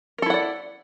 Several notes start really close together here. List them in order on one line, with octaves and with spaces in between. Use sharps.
A#4 A4 E4 F#5 D5